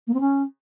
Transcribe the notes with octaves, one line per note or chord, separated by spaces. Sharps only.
A#3
C4
C#4